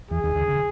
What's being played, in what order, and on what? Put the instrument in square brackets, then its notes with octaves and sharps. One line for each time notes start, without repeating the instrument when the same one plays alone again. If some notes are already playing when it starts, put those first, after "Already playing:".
[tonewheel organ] E2 E3 [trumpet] G#4
[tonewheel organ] D#2 D#3
D2 D3
C#3